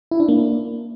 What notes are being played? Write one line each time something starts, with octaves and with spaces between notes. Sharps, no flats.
E4
D4
A#3